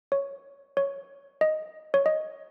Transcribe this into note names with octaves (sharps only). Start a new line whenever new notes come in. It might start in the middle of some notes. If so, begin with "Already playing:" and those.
C#5
C#5
D#5
C#5
D#5